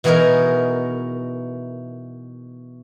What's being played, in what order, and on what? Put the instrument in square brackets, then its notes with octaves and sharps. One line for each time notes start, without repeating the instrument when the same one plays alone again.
[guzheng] B2 E3 B3 D#4 G#4 A#4